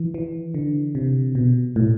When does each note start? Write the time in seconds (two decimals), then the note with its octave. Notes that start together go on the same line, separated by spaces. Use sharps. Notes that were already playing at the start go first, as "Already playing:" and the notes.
Already playing: E3
0.14 E3
0.54 D3
0.95 C3
1.35 B2
1.76 A2